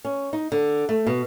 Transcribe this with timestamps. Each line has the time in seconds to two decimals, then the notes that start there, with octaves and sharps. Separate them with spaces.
0.05 C#4
0.33 D#4
0.52 D3
0.89 A3
1.07 B2